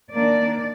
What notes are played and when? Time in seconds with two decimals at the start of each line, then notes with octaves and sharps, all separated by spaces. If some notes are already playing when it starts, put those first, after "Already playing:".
0.12 D#3 A#3 D4 D5